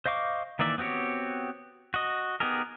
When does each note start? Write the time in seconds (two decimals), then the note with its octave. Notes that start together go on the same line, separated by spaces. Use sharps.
0.06 C5 D#5 F5 C#6 D6
0.59 D#3 E3 A#3 D5 E5
0.78 B3 C4 F#4 G4 C#5
1.94 F#4 D#5
2.40 B3 D#4 G4 G#4 A#4